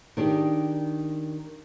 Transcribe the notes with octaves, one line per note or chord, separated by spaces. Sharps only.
D#3 D4 G4 G#4